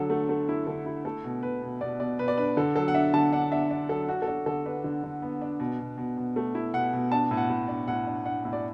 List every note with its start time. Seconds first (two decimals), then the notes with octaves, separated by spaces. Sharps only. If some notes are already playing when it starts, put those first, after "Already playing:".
Already playing: D3 F#3 A4
0.10 A3
0.29 A3
0.49 E4
0.67 D3 A4
0.86 E4
1.05 A3 A4
1.24 B2
1.43 B2 B4
1.62 B2
1.81 B2 D5
2.00 B2 D5
2.19 B2 B4
2.28 D5
2.37 D4 B4
2.57 D3 A4
2.76 F#3 A4
2.88 F#5
2.94 D4 E5
3.14 D3 A5
3.32 D4 F#5
3.52 D4 E5
3.70 D4
3.89 F#3 A4
4.08 D4 F#4
4.22 A4
4.27 D4 F#4
4.46 D3 A4
4.66 D4 B4
4.84 D3
5.03 D3
5.22 B3
5.41 D4
5.60 B2
5.79 B2
5.98 B2
6.17 B2
6.36 A3
6.55 E4
6.74 B2 F#5
6.93 B2
7.12 D4 A5
7.31 A2
7.37 F#5
7.50 A2
7.68 D4
7.88 A2 F#5
8.07 D4
8.25 D4 F#5
8.45 A2
8.53 D5